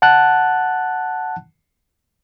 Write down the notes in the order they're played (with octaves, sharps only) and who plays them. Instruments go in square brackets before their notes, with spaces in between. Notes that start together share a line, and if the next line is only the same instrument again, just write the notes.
[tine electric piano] F#5 A5 F#6